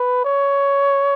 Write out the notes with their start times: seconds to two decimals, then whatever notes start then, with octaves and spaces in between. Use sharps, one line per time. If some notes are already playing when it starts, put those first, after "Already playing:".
Already playing: B4
0.25 C#5